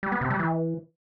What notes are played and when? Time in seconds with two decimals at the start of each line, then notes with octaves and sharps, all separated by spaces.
0.03 G3
0.12 B3
0.21 C3
0.30 G3
0.39 E3